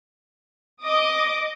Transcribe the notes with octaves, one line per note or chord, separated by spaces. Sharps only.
D#5 D6 D#6